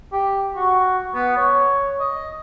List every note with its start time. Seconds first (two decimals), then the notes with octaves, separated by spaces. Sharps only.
0.13 G4
0.56 F#4
1.14 B3
1.37 C#5
2.00 D#5